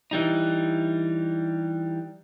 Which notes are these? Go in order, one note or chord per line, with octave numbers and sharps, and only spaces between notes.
E3 G3 D#4